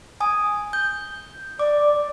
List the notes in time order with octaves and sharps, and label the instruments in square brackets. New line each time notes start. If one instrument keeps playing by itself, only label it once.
[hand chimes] G#5 D#6
G6
[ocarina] D5 [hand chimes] D6